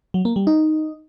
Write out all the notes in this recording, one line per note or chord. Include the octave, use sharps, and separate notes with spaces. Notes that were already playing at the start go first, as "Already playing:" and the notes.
F#3
A#3
G3
D#4